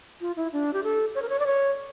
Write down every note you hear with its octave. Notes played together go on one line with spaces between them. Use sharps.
F4
E4
D4
G4
A4
C#5
A#4
C#5
D5
C#5